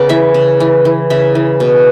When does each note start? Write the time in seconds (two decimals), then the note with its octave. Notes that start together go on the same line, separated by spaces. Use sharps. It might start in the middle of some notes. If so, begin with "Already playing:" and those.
Already playing: C#3 B3 D5 F#5
0.09 E3 E5
0.34 C#3
0.60 E3
0.85 E3
1.10 C#3 E5
1.35 E3
1.60 B2